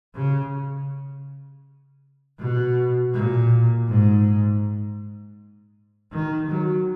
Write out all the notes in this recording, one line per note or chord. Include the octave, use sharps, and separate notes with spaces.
C#3
B2
A#2
G#2
D#3
F#3